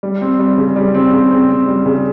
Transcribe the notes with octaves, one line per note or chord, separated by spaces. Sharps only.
G3
C4
G3
C#3
G3
C4
C#3
C4
C4
G3
C#3